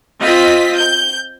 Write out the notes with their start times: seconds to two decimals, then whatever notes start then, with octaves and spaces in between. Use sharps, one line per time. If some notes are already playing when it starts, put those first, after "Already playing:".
0.21 C4 F4 D#5 B6
0.76 G6